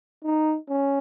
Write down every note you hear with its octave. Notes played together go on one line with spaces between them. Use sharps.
D#4
C#4